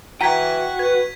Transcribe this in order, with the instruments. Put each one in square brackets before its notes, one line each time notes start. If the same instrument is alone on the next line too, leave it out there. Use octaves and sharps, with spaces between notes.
[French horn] E3 [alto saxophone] F#4 [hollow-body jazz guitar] F#5 G5 A#5 [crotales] G#6 B6 D#7
[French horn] B4 [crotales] G#6